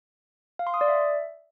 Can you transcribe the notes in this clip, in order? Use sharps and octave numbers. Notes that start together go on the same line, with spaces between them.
F5
C6
D#6
D5
E5